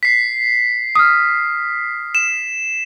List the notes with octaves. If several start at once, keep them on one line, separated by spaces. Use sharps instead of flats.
B6 C7
D#6 F6
E7